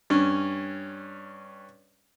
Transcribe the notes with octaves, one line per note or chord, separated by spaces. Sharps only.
G2 C#4